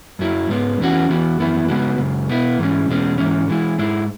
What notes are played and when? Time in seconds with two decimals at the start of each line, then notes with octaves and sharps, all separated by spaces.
0.19 F#2 F#3 E4
0.49 G#2 G#3 B3
0.80 E2 E3 C#4 F#4
1.09 E2 E3 B3 F#4
1.39 F#2 E3 B3 E4
1.68 C#3 G#3 B3 F#4
1.98 F#2 C#3 G#3
2.29 B2 B3 E4
2.59 G#2 E3 G#3 C#4
2.88 E2 B2 G#3 C#4
3.18 G#2 E3 G#3 C#4
3.48 E3 G#3 E4
3.78 G#2 G#3 E4